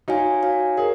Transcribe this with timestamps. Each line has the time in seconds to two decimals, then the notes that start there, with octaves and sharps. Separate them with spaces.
0.08 D#4 F#4 C#5 F5 G#5
0.43 F#4 C#5 F5 G#5
0.77 G#4 A#4 C#5